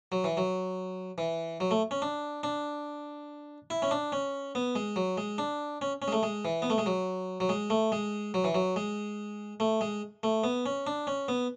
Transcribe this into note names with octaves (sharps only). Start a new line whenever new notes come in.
F#3
E3
F#3
E3
F#3
A3
C#4
D4
D4
E4
C#4
D4
C#4
B3
G#3
F#3
G#3
D4
C#4
C#4
G#3
A3
G#3
E3
B3
A3
G#3
F#3
F#3
G#3
A3
G#3
F#3
E3
F#3
G#3
A3
G#3
A3
B3
C#4
D4
C#4
B3